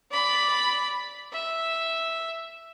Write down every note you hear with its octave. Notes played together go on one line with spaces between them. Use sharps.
D5 B5
E5